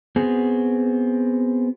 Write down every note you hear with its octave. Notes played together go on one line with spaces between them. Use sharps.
B3 C4 F#4 G#4